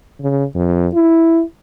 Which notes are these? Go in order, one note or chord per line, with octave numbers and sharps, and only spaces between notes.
C#3
F2
E4